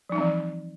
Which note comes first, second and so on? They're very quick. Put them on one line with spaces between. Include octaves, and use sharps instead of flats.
F3 D#4 G3 C4 E3